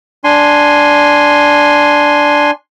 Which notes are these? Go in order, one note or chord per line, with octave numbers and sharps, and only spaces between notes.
D4 G#5 C6